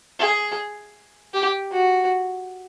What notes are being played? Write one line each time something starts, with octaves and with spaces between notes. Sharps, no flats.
G#4
G4
F#4